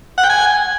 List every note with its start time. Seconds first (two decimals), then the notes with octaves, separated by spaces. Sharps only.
0.18 F#5
0.24 G5
0.30 G#5